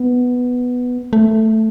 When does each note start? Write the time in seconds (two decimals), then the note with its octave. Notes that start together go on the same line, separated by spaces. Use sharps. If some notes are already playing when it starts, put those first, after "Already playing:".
Already playing: B3
1.13 A3